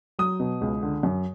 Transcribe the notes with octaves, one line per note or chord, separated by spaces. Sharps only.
F#3 D#6
B2
C#2
D3
F#2